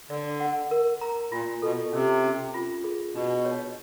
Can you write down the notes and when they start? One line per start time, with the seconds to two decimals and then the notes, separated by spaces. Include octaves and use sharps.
0.10 D3 D5
0.40 F#5
0.71 A#4
1.01 A#5
1.32 A#2 F4
1.62 B2 A4
1.93 C3 C#4
2.24 C#4
2.54 F4
2.84 G#4
3.14 B2 D4
3.45 C#5